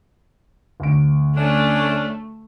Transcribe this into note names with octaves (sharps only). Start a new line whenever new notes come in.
D2 D7
A3 C#4 D4